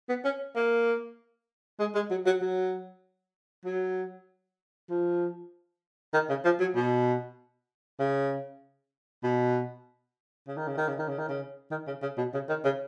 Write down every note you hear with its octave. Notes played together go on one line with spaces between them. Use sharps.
B3
C#4
A#3
G#3
G#3
F#3
F#3
F#3
F#3
F3
D#3
C#3
F3
F#3
B2
C#3
B2
C#3
D#3
C#3
D#3
C#3
D#3
C#3
D#3
C#3
D#3
C#3
C#3
B2
C#3
D#3
C#3